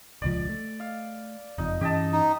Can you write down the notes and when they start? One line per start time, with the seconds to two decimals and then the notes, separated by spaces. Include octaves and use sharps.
0.22 D#1 C#2 F3 D5
0.49 A3
0.80 F5
1.58 F#1 F2 D#4
1.81 G2 E3 C#4 G4 D#5 A5
2.13 D#4